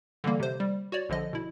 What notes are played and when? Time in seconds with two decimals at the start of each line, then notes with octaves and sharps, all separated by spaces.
0.24 D3 E3 G3 A#3
0.40 C3 C5
0.60 G3
0.92 F#4 C#5 D5
1.09 A#1 D3 F3 D#5
1.33 B2 E4